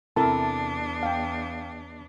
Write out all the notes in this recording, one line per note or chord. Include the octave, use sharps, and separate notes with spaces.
E2 C3 D4 E4 A4 A#4 A5
F5 G5